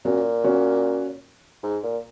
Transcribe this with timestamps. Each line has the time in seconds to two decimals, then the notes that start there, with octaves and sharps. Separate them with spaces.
0.05 A#2 C#4 F#4
0.44 C#4 F#4
1.63 G#2
1.84 A#2